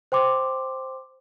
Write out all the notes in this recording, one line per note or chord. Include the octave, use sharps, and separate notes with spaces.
C5 G5 C6 D6